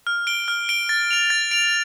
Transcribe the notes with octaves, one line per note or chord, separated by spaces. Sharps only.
F6
D7 G7
F6
D7 G7
A6
D7 F7
A6
D7 F7